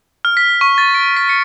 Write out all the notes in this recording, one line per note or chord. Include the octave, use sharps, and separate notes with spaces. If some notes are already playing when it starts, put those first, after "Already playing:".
F6
B6
C#6
A6
D7
B6
C#7